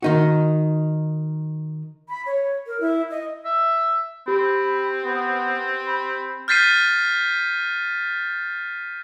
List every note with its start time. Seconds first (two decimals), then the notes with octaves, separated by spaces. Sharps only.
0.02 D#3 D#4 F#4
2.09 B5
2.26 C#5
2.67 A#4
2.80 E4
3.11 D#5
3.45 E5
4.28 C4 G4 B5
5.04 B3
5.87 B5
6.48 F6 G6 A6 B6 C7 D#7